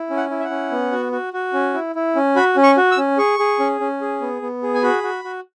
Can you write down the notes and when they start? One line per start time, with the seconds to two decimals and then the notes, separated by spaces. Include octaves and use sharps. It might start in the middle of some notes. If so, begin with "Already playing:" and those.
Already playing: E4
0.10 C#4
0.17 F#5
0.30 E4
0.40 E5
0.44 F#5
0.50 C#4
0.71 B3
0.92 F#4
1.12 F#4
1.33 F#4
1.53 C#4
1.74 E4
1.95 E4
2.16 C#4
2.36 F#4 B5
2.57 C#4
2.63 C#6
2.77 F#4
2.91 E6
2.98 C#4
3.18 G#4 C#6
3.39 G#4
3.60 C#4
3.80 C#4
4.01 G#4
4.21 B3
4.42 B3
4.63 G#4
4.74 G#5
4.82 F#4 B5
5.03 F#4
5.24 F#4